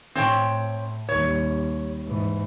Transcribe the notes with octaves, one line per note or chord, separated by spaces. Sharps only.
A2 C4 C#5 G5
D#2 G3 C#5
G#2 E3